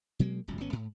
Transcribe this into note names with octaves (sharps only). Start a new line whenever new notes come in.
B2 F#3 G#3 A#3
D1 G1 C#2 F#2
G#1 B3 C#4
G#2